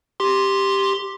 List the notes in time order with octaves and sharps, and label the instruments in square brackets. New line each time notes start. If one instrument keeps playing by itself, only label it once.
[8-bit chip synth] G4 C6